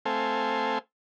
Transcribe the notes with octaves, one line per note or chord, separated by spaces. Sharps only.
A3 C4 A4 C5 F5 G#5